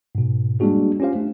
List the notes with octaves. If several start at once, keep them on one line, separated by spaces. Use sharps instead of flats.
G#2 B2
G3 G#3 A#3 D4 F#4 G#4
C#4 F4 G4 C5 F5
A3 D4